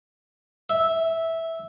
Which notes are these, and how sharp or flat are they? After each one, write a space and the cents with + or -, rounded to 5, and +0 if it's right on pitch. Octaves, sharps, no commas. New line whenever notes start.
E5 -10